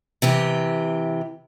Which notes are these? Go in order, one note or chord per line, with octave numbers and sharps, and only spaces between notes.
C3 E3 G4